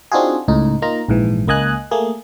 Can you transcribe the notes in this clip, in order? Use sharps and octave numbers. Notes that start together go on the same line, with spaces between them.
C4 D4 D#4 F4 F#4 G#4
C#2 A2 D#4
A#3 D#4 F4 A#5
A#1 G#2 E3
C#2 A#3 D#5 G#5 F#6
A3 A#3 G#4